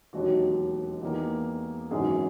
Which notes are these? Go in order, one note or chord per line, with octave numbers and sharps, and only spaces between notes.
E1 D#2 D#3 F#3 F#4
E2 D#3 A#3
G#1 F#2 C#3 E3 G#4